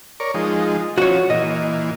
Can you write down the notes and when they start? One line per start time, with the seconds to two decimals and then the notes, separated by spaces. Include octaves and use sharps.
0.20 A#4 C#5 D5
0.34 F3 G#3 D#4
0.98 F3 C#4 F#4 C#5
1.30 A#2 E3 D#5